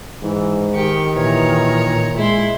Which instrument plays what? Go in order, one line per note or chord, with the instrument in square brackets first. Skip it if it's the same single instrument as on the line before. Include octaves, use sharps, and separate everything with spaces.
[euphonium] G#2 [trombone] E3
[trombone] D#3 [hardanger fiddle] G4 C#6
[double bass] A#2 [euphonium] E3 [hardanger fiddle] C#5 A#5
[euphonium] G#3 [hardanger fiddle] E4 C6